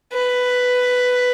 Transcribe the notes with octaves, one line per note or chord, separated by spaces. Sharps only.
B4